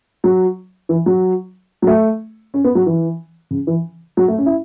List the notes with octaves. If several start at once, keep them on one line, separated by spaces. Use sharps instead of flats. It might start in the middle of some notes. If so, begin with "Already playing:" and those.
F#3
E3
F#3
F#3
A3
C#4
B3
F#3
E3
C#3
E3
F#3
A3
C#4
E4